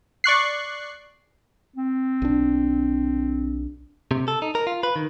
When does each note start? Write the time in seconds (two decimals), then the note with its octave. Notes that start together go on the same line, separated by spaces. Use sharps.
0.24 D5 C#6 F#6 C7
1.76 C4
2.22 B1 D4
4.11 C3
4.28 A4
4.42 D#4
4.55 A#4
4.67 F4
4.83 B4
4.96 D#3